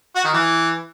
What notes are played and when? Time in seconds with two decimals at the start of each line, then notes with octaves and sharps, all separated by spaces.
0.15 F#4
0.24 D#3
0.33 E3